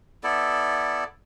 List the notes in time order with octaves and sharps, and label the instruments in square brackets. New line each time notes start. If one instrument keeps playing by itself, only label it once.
[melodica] B3 E4 A4 D5